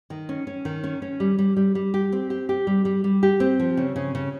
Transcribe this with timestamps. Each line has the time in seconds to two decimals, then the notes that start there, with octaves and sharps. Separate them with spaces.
0.10 D#3
0.29 C#4
0.47 C#4
0.65 D#3
0.84 C#4
1.02 C#4
1.20 G3
1.39 G3
1.57 G3
1.75 G3
1.94 G4
2.12 C4
2.30 G4
2.49 G4
2.67 G3
2.85 G3
3.04 G3
3.23 G4
3.40 C4
3.60 F3
3.77 C#3
3.96 C#3
4.15 C#3